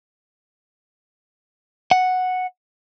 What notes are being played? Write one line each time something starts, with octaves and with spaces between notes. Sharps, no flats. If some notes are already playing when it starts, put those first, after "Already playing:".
F#5